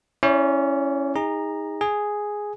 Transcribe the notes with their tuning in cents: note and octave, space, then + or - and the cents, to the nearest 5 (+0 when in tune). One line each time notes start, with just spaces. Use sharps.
C#4 -5 E4 +0 D5 -40
D#4 +20 G#4 -30 A#5 +0
G#4 +0 G#5 +0